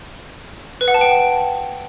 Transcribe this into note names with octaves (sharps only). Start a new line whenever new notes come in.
B4
F#5
A5
G5